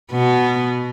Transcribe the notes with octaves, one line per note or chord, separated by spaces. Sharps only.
B2 B3